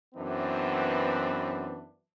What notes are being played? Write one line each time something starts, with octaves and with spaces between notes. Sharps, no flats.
F#2 E3 B3 C4 D4